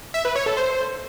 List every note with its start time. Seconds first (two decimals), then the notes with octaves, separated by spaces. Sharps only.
0.14 E5
0.25 B4
0.36 C#5
0.46 A4
0.57 C5